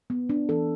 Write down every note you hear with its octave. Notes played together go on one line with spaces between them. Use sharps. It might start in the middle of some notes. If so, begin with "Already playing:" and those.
B3
D4
E3 A4